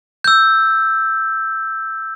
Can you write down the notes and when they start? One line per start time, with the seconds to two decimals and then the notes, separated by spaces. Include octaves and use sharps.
0.24 E6 G6